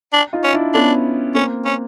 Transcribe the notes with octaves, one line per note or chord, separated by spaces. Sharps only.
D4
D#4 F4
C#4
D4 E4
B3 C#4 D4
A#3 C4 C#4
C#4